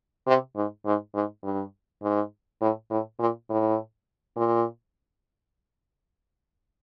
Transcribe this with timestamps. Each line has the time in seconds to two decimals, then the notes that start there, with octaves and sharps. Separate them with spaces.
0.27 C3
0.56 G#2
0.86 G#2
1.15 G#2
1.44 G2
2.03 G#2
2.61 A2
2.90 A2
3.19 A#2
3.49 A2
4.37 A#2